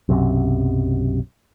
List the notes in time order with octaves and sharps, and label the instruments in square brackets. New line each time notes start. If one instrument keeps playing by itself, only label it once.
[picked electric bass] B1 F#2 C3